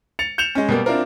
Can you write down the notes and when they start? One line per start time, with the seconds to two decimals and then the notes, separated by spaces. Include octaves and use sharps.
0.19 A6 C#7 F7
0.38 G6 C#7 E7 F7
0.55 G#3 C#4
0.69 B2 G3 A#3
0.86 C4 D4 E4 F4 A#4